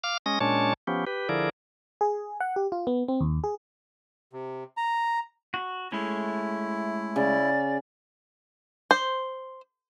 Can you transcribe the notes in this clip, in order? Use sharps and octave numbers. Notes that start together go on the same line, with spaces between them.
F5 D6 F6
G#3 C#4 D#6 A#6
A#2 G#3 C#4 D4 C#5 A5
F3 B3 C#4 G4
G4 B4
D3 F3 E4 G#4 A#4 D5
G#4
F#5
G4
F4
B3
C4
D#2
G#4
C3
A#5
F#4
G#3 A3 C#4 E4
C#3 D5
C5